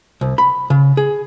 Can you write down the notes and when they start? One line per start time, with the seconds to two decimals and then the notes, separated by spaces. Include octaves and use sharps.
0.21 C2
0.38 B5
0.70 C#3
0.97 G#4